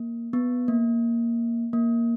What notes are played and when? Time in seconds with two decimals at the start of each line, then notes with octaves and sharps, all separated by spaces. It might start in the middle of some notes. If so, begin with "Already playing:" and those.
Already playing: A#3
0.33 B3
0.68 A#3
1.73 A#3